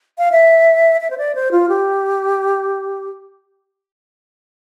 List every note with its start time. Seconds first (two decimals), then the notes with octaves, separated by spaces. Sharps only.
0.18 F5
0.32 E5
1.01 E5
1.10 C5
1.18 D5
1.35 C5
1.52 F4
1.69 G4